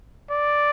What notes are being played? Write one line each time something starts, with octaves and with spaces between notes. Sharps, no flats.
D5